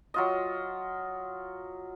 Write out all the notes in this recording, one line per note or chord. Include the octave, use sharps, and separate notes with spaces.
F#3 F4 D#5